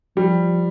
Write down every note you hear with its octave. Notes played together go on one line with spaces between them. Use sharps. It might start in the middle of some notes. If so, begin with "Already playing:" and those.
F3 G3